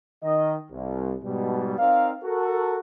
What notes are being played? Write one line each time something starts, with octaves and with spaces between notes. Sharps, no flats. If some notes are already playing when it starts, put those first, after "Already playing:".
D#3 D#5
C2
G#2 B2 G3
C4 D#4 A#4 D5 F5
F#4 A4 A#4